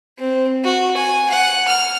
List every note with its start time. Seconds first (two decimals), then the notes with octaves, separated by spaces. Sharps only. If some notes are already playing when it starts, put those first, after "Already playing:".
0.19 C4
0.64 F#4
0.97 G#5
1.29 F#5
1.68 F6